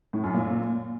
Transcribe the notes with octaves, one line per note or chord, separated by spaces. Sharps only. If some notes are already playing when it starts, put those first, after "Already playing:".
A2
F#2
A#2